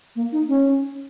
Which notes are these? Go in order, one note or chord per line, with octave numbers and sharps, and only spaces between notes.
A#3
D#4
C#4